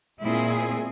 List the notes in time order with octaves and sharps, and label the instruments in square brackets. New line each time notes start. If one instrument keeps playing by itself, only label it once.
[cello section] A#2 G#3 C4 E4 G#4